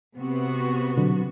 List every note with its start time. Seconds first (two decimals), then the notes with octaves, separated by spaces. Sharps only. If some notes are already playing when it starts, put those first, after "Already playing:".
0.19 C3 B3 F#4
0.97 B2 D3 F#3